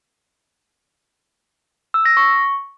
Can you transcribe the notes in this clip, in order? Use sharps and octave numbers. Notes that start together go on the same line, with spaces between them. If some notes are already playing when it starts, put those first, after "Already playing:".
E6
A#6
C#6